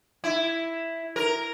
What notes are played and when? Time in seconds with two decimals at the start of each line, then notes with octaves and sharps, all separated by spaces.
0.24 E4
1.16 A#4